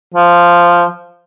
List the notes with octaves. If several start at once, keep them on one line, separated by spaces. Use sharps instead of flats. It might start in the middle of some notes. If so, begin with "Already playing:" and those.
F3